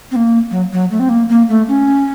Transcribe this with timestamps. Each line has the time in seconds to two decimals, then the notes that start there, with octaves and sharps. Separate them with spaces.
0.11 C4
0.16 A#3
0.51 F#3
0.73 F#3
0.91 A3
1.00 C4
1.09 A#3
1.29 A#3
1.49 A3
1.68 C#4